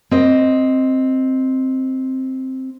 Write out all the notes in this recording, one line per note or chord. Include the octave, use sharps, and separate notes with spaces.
C4 D#5